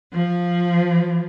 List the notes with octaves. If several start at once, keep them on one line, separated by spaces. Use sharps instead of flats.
F3